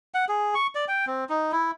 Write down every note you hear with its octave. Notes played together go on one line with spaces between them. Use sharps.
F#5
G#4
C#6
D5
G5
C4
D#4
E4